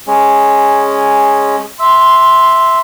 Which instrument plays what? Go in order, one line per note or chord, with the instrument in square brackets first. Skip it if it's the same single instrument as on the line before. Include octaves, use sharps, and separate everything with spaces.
[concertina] G#3 C#4
[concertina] E5 [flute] C6